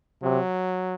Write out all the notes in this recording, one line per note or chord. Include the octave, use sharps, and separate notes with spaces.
C3 F#3